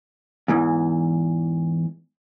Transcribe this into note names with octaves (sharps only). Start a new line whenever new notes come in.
E2 G#2 E3